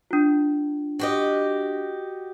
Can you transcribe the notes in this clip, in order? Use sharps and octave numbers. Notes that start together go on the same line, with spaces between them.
D4 F4
F#4 G4 D#5